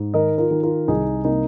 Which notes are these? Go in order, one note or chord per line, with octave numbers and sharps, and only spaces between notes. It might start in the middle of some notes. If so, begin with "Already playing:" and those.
Already playing: G#2
D#3 A#4 D#5
F4 A#4
D#3
F4 A#4
C2 D#4 G#4
C3 A#3 D#4